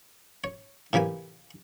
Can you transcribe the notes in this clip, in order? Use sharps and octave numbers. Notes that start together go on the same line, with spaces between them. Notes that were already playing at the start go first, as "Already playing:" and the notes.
C#5
A2 C3 E3 A#3 G#5